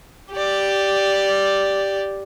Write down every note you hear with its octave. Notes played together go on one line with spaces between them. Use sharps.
G4 D5